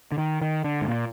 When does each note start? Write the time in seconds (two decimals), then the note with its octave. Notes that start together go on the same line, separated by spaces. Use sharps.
0.12 D3
0.18 D#3
0.41 D#3
0.64 D3
0.82 G#2
0.88 A#2